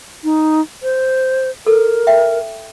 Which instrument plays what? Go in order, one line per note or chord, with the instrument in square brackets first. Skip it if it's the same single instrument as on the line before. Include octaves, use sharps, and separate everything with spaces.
[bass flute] D#4
C5
[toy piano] A4 [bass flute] A#4
[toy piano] E5 G5